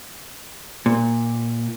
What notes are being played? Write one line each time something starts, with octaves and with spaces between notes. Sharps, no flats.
A#2